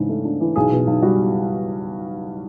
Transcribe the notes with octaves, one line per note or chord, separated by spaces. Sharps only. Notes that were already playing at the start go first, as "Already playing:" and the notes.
Already playing: G#2 C#3 E3 D4
A3
D4
E3
B1 G#4
B2
B1
G3 F#4